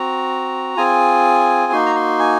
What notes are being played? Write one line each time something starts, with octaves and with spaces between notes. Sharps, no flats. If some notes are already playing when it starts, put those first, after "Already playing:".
Already playing: C4 F#4 A#5
C4 F4 G#4 G#5
A#3 D#4 F#4 C6
A#5
C6
G#5